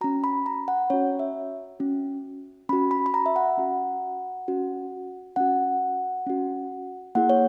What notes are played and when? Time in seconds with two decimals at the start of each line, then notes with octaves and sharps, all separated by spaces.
0.01 C#4 F#4 A#5
0.24 B5
0.46 A#5
0.68 F#5
0.90 C#4 F#4 C#5
1.19 E5
1.80 C#4 F#4
2.69 C#4 F#4 B5
2.91 B5
3.06 B5
3.14 A#5
3.26 E5
3.36 F#5
3.57 C#4 F#4
4.48 C#4 F#4
5.36 C#4 F#4 F#5
6.27 C#4 F#4
7.15 A#3 E4 G#4 F#5
7.29 C#5